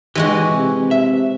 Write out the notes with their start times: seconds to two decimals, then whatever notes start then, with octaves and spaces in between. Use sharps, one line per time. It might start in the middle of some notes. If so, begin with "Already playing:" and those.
0.15 E3 G#3 F#4 G4
0.52 C3
0.91 E5